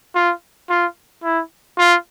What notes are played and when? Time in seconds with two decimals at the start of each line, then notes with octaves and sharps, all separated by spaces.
0.15 F4
0.69 F4
1.24 E4
1.78 F4